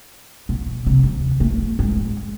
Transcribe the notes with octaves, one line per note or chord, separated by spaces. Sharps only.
B2
C3
D#2
A3
G#3